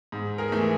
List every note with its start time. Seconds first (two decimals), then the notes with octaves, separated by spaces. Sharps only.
0.12 G#2
0.38 G#4 A#4
0.52 E3 A3